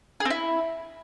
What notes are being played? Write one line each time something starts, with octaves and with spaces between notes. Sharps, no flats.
G#4
C4
E4